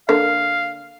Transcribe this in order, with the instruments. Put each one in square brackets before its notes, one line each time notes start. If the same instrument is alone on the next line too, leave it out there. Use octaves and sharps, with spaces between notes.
[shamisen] D3 A#3 [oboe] F5